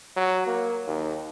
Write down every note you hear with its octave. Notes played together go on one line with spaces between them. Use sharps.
F#3
A#3
D#2